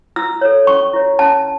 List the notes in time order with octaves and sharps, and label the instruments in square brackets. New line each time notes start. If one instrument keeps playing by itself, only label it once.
[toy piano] E4 E6
A4 C#5
C#4 C#6
E4 C#5
C#4 A5